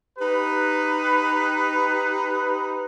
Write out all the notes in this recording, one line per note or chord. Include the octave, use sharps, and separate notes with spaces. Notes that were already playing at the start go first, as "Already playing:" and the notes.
D#4 G4 B4